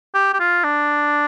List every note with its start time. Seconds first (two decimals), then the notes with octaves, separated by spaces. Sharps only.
0.14 G4
0.34 G4
0.40 F4
0.64 D4